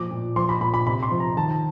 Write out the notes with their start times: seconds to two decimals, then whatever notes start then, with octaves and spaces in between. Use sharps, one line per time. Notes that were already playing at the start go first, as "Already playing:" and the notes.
Already playing: A#2 F3 D6
0.11 A#2
0.36 F3 C6
0.49 B5
0.61 A#2 B5
0.74 B5
0.86 C3 B5
1.03 C6
1.11 F3
1.20 A#5
1.37 D#3 A5